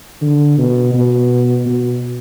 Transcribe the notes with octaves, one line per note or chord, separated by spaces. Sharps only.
D3
B2
B2
B2